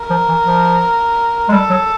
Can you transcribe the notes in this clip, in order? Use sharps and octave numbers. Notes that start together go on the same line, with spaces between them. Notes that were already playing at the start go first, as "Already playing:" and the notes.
Already playing: A#4
F3
E3
F3
G#3
G3 A4
F#3